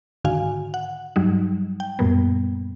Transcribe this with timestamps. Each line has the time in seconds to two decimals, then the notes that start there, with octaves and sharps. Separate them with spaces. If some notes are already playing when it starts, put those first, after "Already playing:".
0.24 G#2 D3 D#3 F#4 F5 G#5
0.74 F#5
1.16 G2 F#3 G3 D#4
1.80 G5
1.99 F#2 A#2 G3 A#3 B3